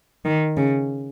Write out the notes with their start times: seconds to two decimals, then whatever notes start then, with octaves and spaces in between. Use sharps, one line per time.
0.25 D#3
0.57 C#3